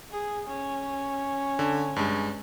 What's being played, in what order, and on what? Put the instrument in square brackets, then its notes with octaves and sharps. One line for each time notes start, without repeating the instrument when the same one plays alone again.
[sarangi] G#4
C#4
[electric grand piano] D3
G2 G#3